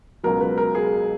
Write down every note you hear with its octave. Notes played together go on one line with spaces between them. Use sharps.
C#2 B2 F#3 A#4
B4
A#4
G#4